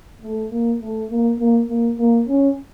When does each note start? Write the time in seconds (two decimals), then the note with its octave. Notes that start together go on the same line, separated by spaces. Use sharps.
0.22 A3
0.51 A#3
0.81 A3
1.10 A#3
1.39 A#3
1.69 A#3
1.99 A#3
2.28 C#4